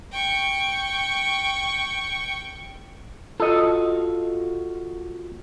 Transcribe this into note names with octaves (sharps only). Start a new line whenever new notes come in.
G5 C#6
F4 F#4 A4 D#5